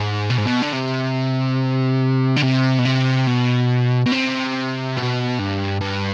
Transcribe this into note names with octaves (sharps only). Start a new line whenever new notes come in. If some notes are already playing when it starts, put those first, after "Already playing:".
Already playing: G#2
B2
G#2
B2
D3
C3
D3
C3
B2
C3
B2
B2
C3
B2
G2
G2